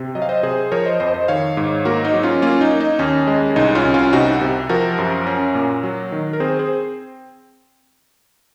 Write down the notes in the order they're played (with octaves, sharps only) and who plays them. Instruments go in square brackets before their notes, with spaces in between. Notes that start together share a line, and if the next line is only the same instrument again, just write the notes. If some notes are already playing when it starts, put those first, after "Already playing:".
Already playing: [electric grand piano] C3 C4
F#3 D#5
F5
C5 D#5
C3 G#4 C5
F3 A#4 C#5
C5 D#5
F2 C5 D#5
C5 D#5
D#3 C#5 F5
G#2
A#3 F#4 A#4
D#4
F#3
C#4 F4
A#3 C#4 F4
D#4
A#3
D#4
D#2 C#4
G#3
C2 D#4
C#4 F4
C2
C#4 F4
C3 D#4 F#4
C3
F3 F#4 A#4
F#2
C#4
A#2
F#3
D#3
A#4
C4 G#4 C5
G#4 C5
C4